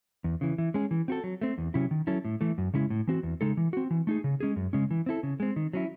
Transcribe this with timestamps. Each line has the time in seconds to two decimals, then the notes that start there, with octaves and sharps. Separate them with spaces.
0.24 E2
0.41 C#3 E3
0.58 E3
0.74 G#3 C#4 G#4
0.91 E3
1.08 C4 F#4 A4
1.24 F#3
1.41 A3 C4
1.58 E2
1.74 C3 F#3 C#4 E4
1.91 D#3
2.07 F#3 C#4 E4 A4
2.25 A2
2.41 E3 A3
2.58 F#2
2.74 C#3 G#3 C#4 E4
2.90 A2
3.07 E3 C4 F#4
3.23 E2
3.41 C#3 G#3 D#4 A4
3.57 E3
3.73 C4 F#4
3.91 E3
4.07 A3 D#4 G#4
4.24 C#3
4.40 G#3 C#4 G#4
4.56 F#2
4.73 C#3 G#3 C#4
4.91 E3
5.06 C4 E4 A4
5.23 C#3
5.40 G#3 C4
5.56 D#3
5.73 F#3 C#4 E4